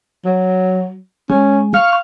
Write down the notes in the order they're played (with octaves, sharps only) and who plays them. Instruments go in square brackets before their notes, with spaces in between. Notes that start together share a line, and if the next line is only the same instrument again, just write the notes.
[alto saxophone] F#3
[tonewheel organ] G#3 [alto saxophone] C#4
[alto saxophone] F5 [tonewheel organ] C#6 F6